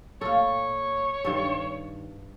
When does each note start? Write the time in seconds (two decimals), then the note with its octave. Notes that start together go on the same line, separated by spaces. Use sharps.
0.21 A#2 A4 C#5 F5
1.25 G2 D#3 A4